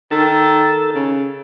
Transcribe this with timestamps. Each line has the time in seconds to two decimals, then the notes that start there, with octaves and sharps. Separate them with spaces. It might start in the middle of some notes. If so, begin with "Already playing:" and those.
0.11 D#3 A4 E6 A6
0.95 C#3